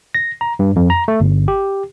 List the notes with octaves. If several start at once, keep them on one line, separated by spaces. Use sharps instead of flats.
A#6
A#5
G2
F2
A#5
A3
G1
G4